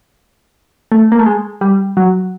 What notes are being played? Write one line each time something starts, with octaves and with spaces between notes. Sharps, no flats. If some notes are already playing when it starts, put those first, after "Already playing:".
A3
A#3
A3
G#3
G3
F#3